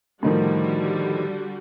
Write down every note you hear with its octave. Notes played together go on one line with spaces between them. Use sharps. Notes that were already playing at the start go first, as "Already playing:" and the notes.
A2 D3 D#3 F3 G3 F#4